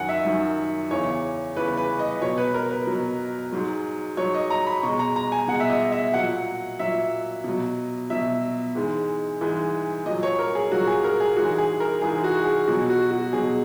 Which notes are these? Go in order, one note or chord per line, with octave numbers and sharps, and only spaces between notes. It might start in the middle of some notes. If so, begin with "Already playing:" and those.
Already playing: F#2 D#3 F#3 F#5 G#5
E5
F#2 D#3 F#3
E2 C#3 E3 C#5
E2 C#3 E3 B4
B4
D#5
B2 F#3 C#5
B4
A#4
B4
B2 F#3
G#2 F#3
G#2 F#3 C#5
D#5
A#5
B5
B2 G#3 C#6
A#5
A#5
G#5
B2 G#3 F#5
E5
D#5
E5
A#2 F#3 F#5
A#2 F#3 E5
B2 F#3
B2 F#3 E5
G#2 E3 G#3
G#2 E3 G#3
A#2 D#5
F#3
C#5
A#4
G#4
A#2 F#3 F#4
G#4
A#4
G#4
G#2 E3 G#3 F#4
G#4
A#4
G#2 E3 G#3 G#4
F#4
G#4
B2 F#3 F#4
F#4
F#4
B2 F#3 G#4